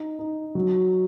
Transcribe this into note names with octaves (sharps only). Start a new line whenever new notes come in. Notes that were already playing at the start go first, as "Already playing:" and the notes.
Already playing: D#4
D#4
F#3